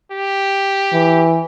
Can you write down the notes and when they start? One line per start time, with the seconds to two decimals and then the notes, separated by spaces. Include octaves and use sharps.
0.12 G4
0.93 E3